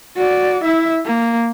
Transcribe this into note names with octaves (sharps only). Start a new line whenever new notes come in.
F#4 D5
E4 E5
A#3